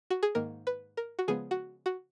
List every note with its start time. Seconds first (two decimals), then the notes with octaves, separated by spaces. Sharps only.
0.10 F#4
0.23 G#4
0.35 G#2 D#3 A#3 A#4
0.67 B4
0.97 A#4
1.19 F#4
1.28 C#3 F3 G#3 B3 G#4
1.51 F#4
1.86 F#4